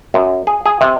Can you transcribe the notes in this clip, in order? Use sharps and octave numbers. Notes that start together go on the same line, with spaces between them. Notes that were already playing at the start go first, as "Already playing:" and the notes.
F#2
G#4
G#4
C3